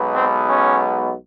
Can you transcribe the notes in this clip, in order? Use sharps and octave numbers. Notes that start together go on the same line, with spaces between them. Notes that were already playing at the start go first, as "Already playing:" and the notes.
Already playing: B1 B2 G#3 B3
C4
C#4